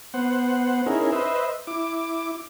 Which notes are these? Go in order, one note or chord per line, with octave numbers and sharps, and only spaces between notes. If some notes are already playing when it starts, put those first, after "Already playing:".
B3 C5 F#5
C#4 D#4 E4 G#4 A#4
B4 C5 D#5 E5
E4 D6